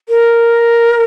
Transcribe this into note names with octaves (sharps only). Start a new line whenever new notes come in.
A#4